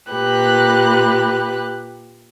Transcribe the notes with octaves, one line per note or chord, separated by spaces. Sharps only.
A#2 G4 B4 F#6